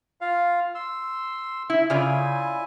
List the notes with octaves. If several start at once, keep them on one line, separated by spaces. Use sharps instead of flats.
F4 F5
C6 E6
E4 E5
C#3 E4 F4 D5 G#5